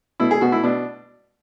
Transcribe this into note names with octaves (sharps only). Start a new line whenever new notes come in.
B2 E4
G#4
B2 F#4
E4
B2 D4